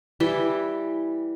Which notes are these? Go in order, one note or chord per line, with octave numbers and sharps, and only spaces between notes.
E3 G3 E4 G5